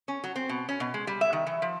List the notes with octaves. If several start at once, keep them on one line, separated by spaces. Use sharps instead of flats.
C#4
F#3
C4
B2
C#4
B2
G#3
G3
E5
D#3
E3
F3